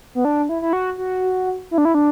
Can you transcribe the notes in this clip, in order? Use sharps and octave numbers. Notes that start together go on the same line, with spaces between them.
B3
D4
E4
E4
F#4
F#4
E4
D4
E4
D4